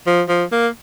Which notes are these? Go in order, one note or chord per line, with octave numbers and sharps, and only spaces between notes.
F3
F3
A#3